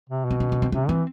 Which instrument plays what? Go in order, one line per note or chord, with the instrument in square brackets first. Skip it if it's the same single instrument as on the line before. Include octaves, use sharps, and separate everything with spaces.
[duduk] C3
B2
[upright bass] C4
C#4
C#4
C4
[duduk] C3 [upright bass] C#4
[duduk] E3 [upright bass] C4